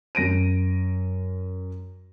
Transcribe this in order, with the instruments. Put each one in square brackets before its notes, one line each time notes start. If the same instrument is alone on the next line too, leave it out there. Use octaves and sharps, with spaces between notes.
[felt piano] F#2 A#6 D7 D#7